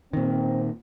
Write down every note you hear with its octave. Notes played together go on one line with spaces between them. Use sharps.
A#2 D#3 C4